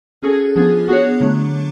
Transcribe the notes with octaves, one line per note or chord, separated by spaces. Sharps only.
C#4 F#4 G#4 A4
F3 B3 D4 F4 G#4
B3 D4 F#4 G#4 C#5
D3 F#3 A3 D4